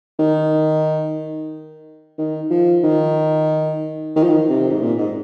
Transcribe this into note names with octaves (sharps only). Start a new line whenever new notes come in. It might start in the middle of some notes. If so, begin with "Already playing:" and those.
D#3
D#3
F3
D#3
D#3
F3
D#3
C3
G#2
A#2
G#2